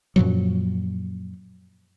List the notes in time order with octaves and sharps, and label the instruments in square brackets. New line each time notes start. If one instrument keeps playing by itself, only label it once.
[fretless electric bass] F#2 A#2 F3 F#3